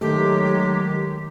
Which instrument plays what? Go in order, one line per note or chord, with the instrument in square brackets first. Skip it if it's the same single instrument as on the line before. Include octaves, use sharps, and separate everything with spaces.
[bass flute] D#3 [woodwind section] F#3 G#3 [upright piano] A3 [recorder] G4